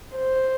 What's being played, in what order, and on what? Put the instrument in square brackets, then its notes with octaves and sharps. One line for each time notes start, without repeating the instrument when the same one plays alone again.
[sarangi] C5